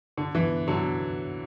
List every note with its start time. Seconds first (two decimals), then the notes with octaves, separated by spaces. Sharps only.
0.17 D3
0.35 E3
0.68 D3 F#3